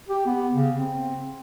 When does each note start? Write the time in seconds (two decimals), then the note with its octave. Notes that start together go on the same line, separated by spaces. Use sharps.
0.09 G4
0.26 B3
0.54 C#3
0.77 C4